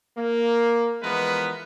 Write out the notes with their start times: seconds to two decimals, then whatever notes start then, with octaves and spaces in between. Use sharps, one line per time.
0.18 A#3
1.03 E3 F3 G#3 B3 A#4 B4